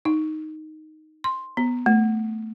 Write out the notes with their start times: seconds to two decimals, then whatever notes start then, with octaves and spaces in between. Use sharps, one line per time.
0.05 D#4
1.24 C6
1.57 B3
1.86 A3